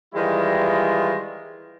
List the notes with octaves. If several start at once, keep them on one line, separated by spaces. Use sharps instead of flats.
D#3 E3 G3 G#3 E4 F4